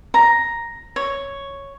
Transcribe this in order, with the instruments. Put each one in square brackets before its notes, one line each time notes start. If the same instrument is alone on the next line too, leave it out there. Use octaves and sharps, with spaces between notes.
[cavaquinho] A#5
C#5